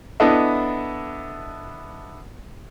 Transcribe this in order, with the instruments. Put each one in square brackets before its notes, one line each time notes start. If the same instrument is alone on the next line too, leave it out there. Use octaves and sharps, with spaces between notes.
[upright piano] B3 D4 E4 A4 D#5 E5